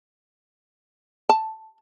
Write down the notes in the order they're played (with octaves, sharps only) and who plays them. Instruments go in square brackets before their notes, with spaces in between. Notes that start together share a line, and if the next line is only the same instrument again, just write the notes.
[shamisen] A5